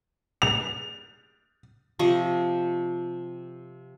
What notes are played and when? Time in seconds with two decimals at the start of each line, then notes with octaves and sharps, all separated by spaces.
0.42 F7
1.99 C3 F3 D#5 C#6